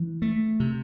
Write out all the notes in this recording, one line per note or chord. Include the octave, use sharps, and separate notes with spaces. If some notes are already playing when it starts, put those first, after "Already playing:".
Already playing: E3
A3
C3